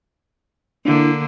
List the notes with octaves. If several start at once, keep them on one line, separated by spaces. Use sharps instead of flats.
D3 A#3 D4 E4